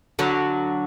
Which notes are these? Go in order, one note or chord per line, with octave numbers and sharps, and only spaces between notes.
D3 F#3